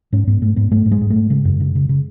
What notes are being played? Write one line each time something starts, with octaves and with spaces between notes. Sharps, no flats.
G#2 C#4
G#2 B3
G#2 A3
G#2 B3
G#2 A3
G#2
G#3
G#2
A3
G#2
C#3 G#3
F#2
C#3
C#3
C#3